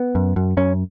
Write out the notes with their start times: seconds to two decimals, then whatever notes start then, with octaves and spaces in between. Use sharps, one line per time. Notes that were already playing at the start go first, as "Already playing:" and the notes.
Already playing: B3
0.15 F#2
0.36 F#2
0.57 F#2 C#4